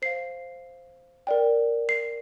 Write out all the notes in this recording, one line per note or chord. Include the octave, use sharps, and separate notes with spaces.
C5 F5 C7
A#4 D5 G5
C7